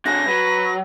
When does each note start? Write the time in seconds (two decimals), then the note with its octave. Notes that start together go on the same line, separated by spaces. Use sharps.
0.05 D3 F#4 G#4 A#6
0.28 F#3 B4